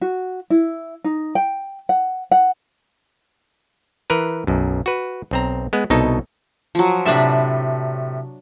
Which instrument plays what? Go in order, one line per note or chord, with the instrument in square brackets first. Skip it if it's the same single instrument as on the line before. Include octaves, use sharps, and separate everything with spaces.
[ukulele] F#4
E4
D#4
G5
F#5
F#5
[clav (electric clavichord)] E3 A#4 B4
B1 F#2
F#4 B4
B1 C4 A#5
G#3 B3
C2 B2 D#4 A4
[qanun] F3 F#3
[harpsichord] A2 C3 [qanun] D4 B4 E5